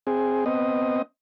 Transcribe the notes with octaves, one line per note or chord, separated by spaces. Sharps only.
C4 G#4
B3 C4 D#5